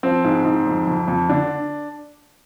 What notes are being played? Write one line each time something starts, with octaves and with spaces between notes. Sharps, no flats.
F3 C4
G#2
G#2
F2
F2
F2
D3 D4